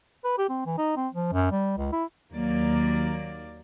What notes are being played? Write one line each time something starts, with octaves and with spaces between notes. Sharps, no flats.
B4
G4
C4
E3
D#4
C4
F3
F#2
G3
C#2
E4
D#2 F#3 A#3 D5